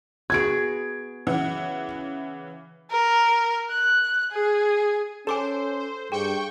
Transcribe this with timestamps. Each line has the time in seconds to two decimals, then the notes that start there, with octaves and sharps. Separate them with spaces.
0.30 B3 F#4 G#4 G#6 D7
1.27 C#3 E3 F#5
2.92 A#4
3.71 F#6
4.32 G#4
5.27 C#4 A4 C5 G#5 D6 E7
5.78 C5
6.12 G2 G#4 G5 C#6